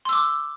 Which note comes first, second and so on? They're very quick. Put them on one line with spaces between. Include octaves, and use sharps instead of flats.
C6 E6 D6